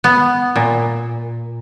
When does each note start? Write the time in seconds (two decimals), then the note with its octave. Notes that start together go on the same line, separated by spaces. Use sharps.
0.04 B3
0.56 A#2